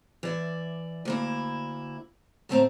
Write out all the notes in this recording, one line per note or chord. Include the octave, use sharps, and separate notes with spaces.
E3 D5 E5
D2 A#3 E4
A2 D3 A3 C4 F5 A#5